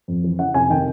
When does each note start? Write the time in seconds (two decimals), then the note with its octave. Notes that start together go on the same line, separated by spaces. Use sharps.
0.08 F2
0.24 E3
0.39 C#3 F#5
0.54 F1 G#5
0.70 D#3 G5